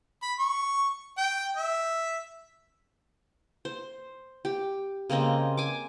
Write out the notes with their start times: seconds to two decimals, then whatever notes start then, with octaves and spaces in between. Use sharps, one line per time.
0.23 B5
0.39 C#6
1.18 G5
1.57 E5
3.65 C5
4.45 G4
5.10 C#3 A#3 C4 D#5
5.57 G#5 D6